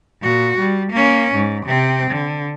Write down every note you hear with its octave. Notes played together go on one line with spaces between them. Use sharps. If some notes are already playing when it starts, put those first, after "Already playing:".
A#2 F#4
G3
A#3 C#4
G#2
C3 C4
D3